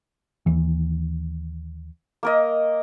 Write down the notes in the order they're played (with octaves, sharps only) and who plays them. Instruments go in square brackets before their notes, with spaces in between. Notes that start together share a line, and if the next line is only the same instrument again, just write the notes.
[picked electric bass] D#2 E3
[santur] A#3 A#4 D#5